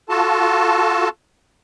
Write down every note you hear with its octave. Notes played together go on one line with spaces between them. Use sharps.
F4 F#4 A4 A5